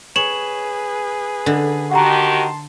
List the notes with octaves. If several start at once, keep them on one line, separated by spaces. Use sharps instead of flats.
G#4 B4 C#5 E7 F#7
D3
D#3 F#4 G4 F#5 A5 A#5 C6